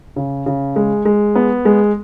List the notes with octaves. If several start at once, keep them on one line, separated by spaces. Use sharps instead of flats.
C#3
C#3
G#3
G#3
B3
G#3